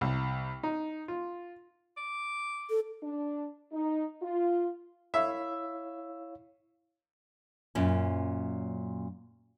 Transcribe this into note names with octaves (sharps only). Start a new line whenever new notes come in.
C2
D#4
F4
D6
A4
D4
D#4
F4
E4 C#5 E5 F5
F#2 A#2 C#4